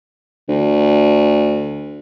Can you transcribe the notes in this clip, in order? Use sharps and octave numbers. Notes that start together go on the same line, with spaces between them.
D2